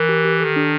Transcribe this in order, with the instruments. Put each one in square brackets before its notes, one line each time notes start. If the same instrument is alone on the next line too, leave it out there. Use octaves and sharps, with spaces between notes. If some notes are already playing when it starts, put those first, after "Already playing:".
Already playing: [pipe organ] E3 [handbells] A#4
[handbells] G4
G4
[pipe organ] D#3 [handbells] A4
[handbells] D4